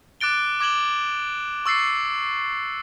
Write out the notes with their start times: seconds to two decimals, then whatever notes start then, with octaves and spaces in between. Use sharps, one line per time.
0.21 D6 F#6 A6 D7 G7
0.61 D6 G#6 E7 F#7 G7
1.66 C#6 E6 A6 C7 C#7